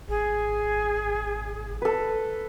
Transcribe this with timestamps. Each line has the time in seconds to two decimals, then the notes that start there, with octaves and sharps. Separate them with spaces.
0.08 G#1 G#4
1.82 A4 B4